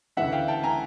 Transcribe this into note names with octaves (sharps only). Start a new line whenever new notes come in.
D2 C#3 E3 E5 F#5
F5 G5
G5 A5
G#5 A#5